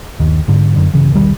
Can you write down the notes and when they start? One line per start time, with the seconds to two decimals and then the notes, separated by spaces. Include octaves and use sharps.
0.20 G1 D#2 D#3
0.48 G#2 D3
0.76 F#2 D3
0.94 G1 C2 C#3 E3
1.12 E1 C2 D#3 G3